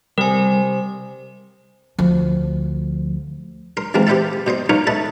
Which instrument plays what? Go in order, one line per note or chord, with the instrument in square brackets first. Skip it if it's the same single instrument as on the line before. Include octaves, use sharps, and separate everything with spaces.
[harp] C3 [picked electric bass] G3 [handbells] A#4 G#5
[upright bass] D2 F3
[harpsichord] A#4 C6
E3 G#3 C4 F4 A#4
G4 B4 C5 E5 F5 A5
B2 C5 D#5 C6
D#4 F4 A#4 B4 C#5
A4 B4 D#5 E5 A5 B5